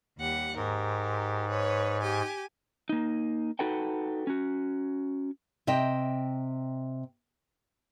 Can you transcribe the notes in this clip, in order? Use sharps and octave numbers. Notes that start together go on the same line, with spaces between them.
D#2 G3 F#5
G#2 G4 A#4
B4 C#5
G4 G#5
A#3 D#4
D#4 F#4 A4 B4 F#5 G5
C#4 F#4
C3 D#5 E5 G5